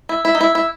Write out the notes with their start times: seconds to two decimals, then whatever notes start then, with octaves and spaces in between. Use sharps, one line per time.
0.09 E4
0.25 E4
0.35 D#4
0.41 E4
0.55 E4